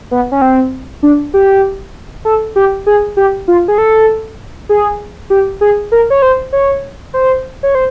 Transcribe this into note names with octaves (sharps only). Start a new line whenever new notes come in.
B3
C#4
C4
D4
G4
A4
G4
G#4
G4
F4
G#4
A4
G#4
G4
G#4
A#4
C#5
C5
C#5
C5
C#5
C5